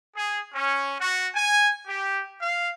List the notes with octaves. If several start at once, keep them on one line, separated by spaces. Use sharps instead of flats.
G#4
C#4
F#4
G#5
G4
F5